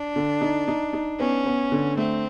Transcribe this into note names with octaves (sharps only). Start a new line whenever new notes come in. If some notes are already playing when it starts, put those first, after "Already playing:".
Already playing: D4
D3
D#4
D#4
D#4
B3 C#4
B3
D3
A3 C4